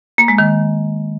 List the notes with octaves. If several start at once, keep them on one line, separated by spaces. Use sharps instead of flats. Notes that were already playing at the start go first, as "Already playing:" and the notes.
A#3
G#3
D#3